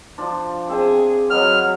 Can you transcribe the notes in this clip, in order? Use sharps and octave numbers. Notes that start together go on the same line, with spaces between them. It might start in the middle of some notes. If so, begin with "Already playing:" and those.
F3 D4 F4
C4 G#4 E5
F#3 B4 D#5 F#5 F6